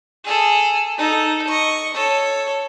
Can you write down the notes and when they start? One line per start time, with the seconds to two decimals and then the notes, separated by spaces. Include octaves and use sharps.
0.24 G#4 A4
0.98 D#4 A4
1.48 D#5 C#6
1.94 A4 C#5